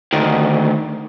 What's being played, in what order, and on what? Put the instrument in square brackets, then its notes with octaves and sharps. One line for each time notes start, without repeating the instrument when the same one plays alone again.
[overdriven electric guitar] D2 D#3